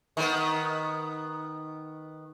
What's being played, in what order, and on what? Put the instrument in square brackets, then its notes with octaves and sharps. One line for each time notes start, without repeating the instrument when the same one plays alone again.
[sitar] D#3 B3